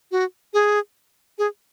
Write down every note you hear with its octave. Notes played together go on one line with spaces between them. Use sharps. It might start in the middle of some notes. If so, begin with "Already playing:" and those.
F#4
G#4
G#4